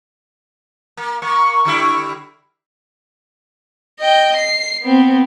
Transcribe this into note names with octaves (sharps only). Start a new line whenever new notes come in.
A#3
A#3 C#6
D3 G3 E4
D#5 G5
C7
B3 C4